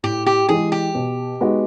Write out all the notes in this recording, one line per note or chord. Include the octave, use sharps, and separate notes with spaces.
A2 G4
G4
E3 G#3 G#4
G4
B2
G#3 B3 D#4 F#4